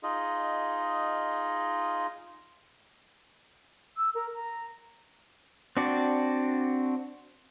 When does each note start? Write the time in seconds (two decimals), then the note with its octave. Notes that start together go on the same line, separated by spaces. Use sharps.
0.03 D#4 F4 G#4 D#5
3.97 E6
4.15 A#4
4.35 A#5
5.77 C4 D4 F#4 D5